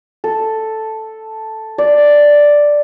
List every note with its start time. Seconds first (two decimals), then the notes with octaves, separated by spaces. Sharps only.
0.24 A4
1.78 D5